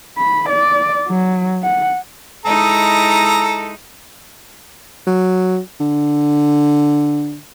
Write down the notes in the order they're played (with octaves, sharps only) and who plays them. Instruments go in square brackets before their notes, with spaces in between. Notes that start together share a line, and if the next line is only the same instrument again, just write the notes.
[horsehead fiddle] B5
D5
F#3
F#5
[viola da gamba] G#3 D#4 E4 [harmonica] A4 A#5
[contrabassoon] F#3
D3